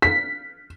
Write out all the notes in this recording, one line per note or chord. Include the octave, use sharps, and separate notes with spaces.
B6